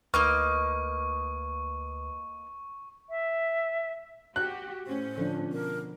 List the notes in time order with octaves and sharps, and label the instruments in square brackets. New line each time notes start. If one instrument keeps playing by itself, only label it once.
[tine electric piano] D2 B4 B5 [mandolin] A#3 D#4 F6 [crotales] C#6
[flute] E5
[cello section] F#4 G4 [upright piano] F#6
[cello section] A2 C#4 [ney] C5
[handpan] D3 F3 D4
[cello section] B2 [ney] A#4